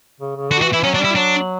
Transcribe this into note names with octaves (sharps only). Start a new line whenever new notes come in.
C#3
C#3
D3 F#4
E3 F#4
E3 E4
F#3 C#4
D4
G3
E4
F#3 D4